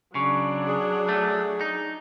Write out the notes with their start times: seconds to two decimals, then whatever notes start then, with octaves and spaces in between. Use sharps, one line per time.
0.15 C#3 F#3 D4 C#6
0.67 G#4
1.09 A3
1.61 D#4